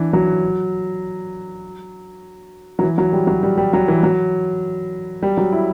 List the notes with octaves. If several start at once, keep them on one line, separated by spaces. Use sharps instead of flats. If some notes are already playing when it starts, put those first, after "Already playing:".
Already playing: E3 D4
F#3
F#3
E3
F#3
G3
F#3
G3
G3
F#3
E3
F#3
G3
F#3
E4